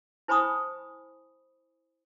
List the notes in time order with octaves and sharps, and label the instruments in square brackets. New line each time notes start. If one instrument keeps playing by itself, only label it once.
[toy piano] E4 C5 G#5 B5 C#6 D#6